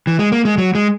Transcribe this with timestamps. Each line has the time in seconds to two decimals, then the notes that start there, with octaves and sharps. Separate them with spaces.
0.07 E3
0.19 G#3
0.32 A#3
0.45 G#3
0.58 F#3
0.75 G#3